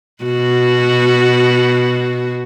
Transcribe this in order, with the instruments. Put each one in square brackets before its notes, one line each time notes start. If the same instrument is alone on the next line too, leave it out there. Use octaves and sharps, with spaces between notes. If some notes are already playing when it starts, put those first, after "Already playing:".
[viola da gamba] B2 F#4